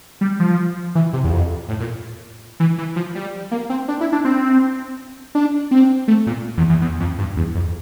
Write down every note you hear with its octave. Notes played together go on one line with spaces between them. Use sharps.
G3
F3
E3
C3
E2
F2
A2
A#2
E3
E3
F3
G3
A#3
C4
D4
E4
D4
C4
D4
C4
A3
A#2
E2
E2
E2
F2
G2
E2
F2